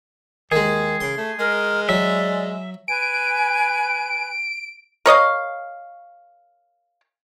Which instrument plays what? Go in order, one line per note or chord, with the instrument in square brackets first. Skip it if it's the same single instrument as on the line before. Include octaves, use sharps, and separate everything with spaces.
[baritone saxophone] D#2 [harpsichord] D#3 G#3 [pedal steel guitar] G#4
[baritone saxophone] C#3 [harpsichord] C6
[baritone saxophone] A3
[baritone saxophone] G#3 [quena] A#4
[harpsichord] F#3 [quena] D5 [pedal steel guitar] E5
[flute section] B4 G#5 [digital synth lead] D7
[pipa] A#4 C#5 D#5 F5